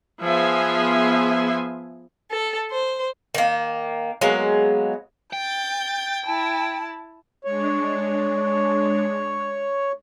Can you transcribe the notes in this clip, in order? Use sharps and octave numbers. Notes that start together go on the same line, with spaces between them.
F3 B3 G#4 E5 G#5 C6
A4
C5
D#3 A#3
F#3 G#3 A#3 B3
G5 G6 A6
E4 A5
G#3 D4 C#5